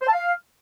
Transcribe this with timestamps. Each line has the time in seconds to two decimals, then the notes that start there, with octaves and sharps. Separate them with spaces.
0.02 C5
0.07 A5
0.13 F5